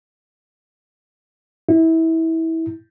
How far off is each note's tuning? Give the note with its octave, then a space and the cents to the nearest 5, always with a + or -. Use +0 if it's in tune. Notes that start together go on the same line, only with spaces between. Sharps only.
E4 -25